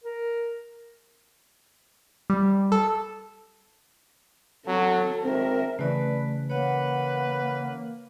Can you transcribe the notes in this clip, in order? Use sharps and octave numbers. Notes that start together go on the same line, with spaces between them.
A#4
G3
A4
F#3 C4 A4
G#1 C4 A#4 E5
C#3 E3 A3 C#4 B4 D5
A#3 B4 C#5 F#5